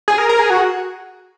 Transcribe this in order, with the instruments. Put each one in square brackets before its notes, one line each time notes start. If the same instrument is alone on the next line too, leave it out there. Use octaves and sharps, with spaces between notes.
[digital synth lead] G#4
A#4
A#4
G#4
F#4